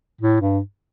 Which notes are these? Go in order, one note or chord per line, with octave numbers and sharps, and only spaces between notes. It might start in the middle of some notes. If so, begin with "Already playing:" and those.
A2
G2